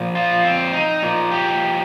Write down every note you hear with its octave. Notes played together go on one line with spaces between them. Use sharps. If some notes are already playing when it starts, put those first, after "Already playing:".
Already playing: A#2 F3
F4
C4
D#4
A#2 F3 A#3
G4